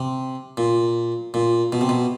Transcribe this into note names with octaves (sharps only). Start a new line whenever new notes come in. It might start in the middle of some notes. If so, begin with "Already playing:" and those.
Already playing: C3
A#2
A#2
B2
C3
B2